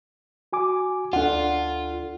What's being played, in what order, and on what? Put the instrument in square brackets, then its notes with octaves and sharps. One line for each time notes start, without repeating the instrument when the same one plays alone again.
[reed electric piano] F#4 G#5 D6
[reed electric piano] D2 A4 [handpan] D4 F#5 [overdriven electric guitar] F4